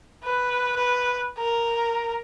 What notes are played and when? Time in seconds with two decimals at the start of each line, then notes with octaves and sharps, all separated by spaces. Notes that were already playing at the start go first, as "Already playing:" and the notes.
0.24 B4
0.77 B4
1.38 A#4